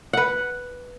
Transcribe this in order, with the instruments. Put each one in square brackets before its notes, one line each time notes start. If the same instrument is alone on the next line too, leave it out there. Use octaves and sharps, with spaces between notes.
[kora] B4 F#5